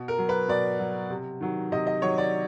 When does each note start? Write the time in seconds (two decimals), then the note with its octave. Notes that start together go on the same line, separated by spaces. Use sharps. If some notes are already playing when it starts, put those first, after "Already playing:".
Already playing: B2
0.08 A#4
0.18 F#3
0.29 B4
0.48 B2 D5
0.79 F#3
1.10 C3
1.40 D#3 F#3
1.72 C3 D#5
1.87 D#5
2.02 D#3 F#3 C#5
2.18 D5